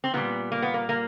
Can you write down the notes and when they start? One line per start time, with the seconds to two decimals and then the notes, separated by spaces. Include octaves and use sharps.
0.04 C4
0.14 A#2 G3 B3
0.52 A#3
0.62 B3
0.74 A#3
0.89 A#3